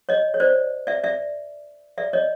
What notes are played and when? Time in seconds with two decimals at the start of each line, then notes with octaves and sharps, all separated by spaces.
0.09 C#5 D#5
0.34 C#5
0.40 C5 D5
0.87 D5 E5
1.04 D5 E5
1.98 D5 E5
2.13 C#5 D#5